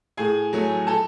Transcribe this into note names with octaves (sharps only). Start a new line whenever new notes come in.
A2 G#4 G#5
F#3 A3
A4 A5